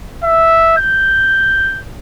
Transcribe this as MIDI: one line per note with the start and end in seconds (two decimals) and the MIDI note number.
0.24 0.74 76
0.78 1.82 91